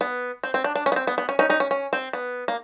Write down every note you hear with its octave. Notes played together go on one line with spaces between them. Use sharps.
B3
C4
C4
D4
D4
C#4
B3
C4
B3
B3
C#4
C#4 D#4
C#4 D#4
C#4
C#4
C4
B3
A#3